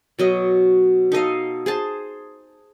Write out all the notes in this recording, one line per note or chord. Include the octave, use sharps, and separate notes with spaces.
B2 F#3 D#5
D#4 A4 D#5 F5
G#4 C5 A5